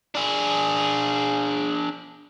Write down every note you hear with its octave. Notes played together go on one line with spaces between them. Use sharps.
D4 G#4